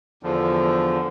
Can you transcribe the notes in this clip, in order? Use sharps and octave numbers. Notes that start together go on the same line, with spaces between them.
E2 D3 F3